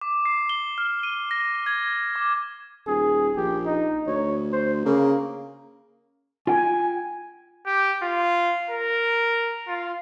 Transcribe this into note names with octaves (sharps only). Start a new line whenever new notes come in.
D6
C7
G7
F6
D#7
A#6
G#6
D6
D#1 G#4
A#1 G4
D#4
D2 C#5
C5
C#3 A#3
F4 G5 G#5
G4
F4
A#4
F4